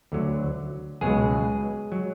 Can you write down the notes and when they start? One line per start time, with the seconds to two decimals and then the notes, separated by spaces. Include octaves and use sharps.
0.12 D2 D3 F#3
1.01 C#2 B2 F#3 G#3 G#4
1.92 F#3